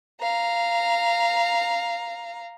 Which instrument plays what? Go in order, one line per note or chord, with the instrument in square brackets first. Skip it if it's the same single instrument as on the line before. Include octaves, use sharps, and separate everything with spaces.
[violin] F5 A#5